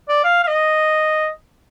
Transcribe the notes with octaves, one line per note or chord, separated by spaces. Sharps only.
D5
F5
F5
D#5